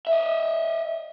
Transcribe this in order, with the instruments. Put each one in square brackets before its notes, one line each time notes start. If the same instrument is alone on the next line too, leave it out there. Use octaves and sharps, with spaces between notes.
[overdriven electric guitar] D#5 E5